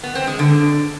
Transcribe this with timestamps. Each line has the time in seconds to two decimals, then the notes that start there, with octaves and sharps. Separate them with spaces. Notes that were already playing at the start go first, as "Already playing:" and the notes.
0.03 B3
0.15 C4
0.27 G#3
0.39 D3